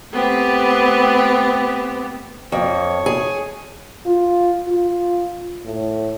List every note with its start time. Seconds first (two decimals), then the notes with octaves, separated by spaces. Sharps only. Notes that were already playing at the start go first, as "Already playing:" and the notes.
0.11 A3 B3 C4 G4
2.52 F2 C#5
3.06 G#4
4.06 F4
4.68 F4
5.65 A2